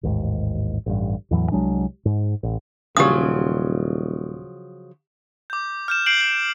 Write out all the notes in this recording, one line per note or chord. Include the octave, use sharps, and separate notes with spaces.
A1 D#2 G#2
A1 G2
E2 A2 E3 F#3
C2 F#3 G#3 D4
G#2
A1
D#1 C#3 F3 F#3 G4 D#6
D6 G6
F6 G6 E7
G6 C7 D7 F#7
G6